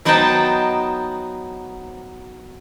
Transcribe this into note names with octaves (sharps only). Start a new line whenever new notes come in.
F#3 B3 D#4 C5 G5 A5